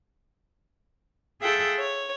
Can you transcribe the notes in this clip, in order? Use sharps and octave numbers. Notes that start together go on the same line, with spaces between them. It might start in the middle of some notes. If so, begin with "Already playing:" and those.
F4 G#4 A4 E5 F#5 G5
C#5